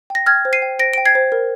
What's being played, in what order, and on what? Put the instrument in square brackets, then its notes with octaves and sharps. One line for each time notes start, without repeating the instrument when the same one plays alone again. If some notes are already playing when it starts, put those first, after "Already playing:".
[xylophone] G5 A#6
G5 F6 G#6
C5
C7 D#7
G5
C5 A#6 D7
G5 D7
G#6 C7
C5
A#4